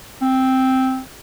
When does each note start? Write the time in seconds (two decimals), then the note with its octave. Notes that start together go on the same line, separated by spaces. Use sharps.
0.22 C4